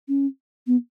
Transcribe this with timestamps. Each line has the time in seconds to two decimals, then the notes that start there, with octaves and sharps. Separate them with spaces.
0.08 C#4
0.67 B3